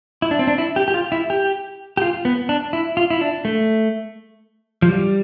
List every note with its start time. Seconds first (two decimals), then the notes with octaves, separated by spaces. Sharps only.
0.22 E4
0.31 D4
0.39 C4
0.47 D4
0.58 E4
0.76 G4
0.88 G4
0.94 F4
1.12 E4
1.30 G4
1.97 G4
2.02 F4
2.25 B3
2.49 D4
2.73 E4
2.97 F4
3.10 E4
3.21 D4
3.45 A3
4.82 F3
4.88 G3